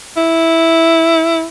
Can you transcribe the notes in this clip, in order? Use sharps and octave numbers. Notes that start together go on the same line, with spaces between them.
E4